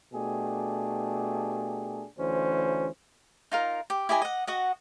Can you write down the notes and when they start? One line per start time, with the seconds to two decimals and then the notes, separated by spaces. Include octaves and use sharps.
0.13 B2 A3 D4 G4 G#4
2.18 D2 E3 C#4 C5
3.52 D#4 F4 A#4
3.90 G4
4.09 E4 G4 D#5 G#5
4.21 D#5 F#5
4.47 F#4 D#5 F#5